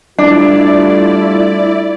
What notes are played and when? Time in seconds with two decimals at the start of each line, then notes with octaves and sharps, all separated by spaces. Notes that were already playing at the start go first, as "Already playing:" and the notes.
0.19 G3 A3 D4 E4 F4 D5